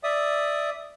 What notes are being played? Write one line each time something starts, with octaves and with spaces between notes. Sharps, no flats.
D5 E5 D#6